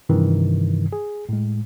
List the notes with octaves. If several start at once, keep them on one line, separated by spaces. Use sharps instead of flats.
G2 C3 D#3 E3
G#4
A2 G#3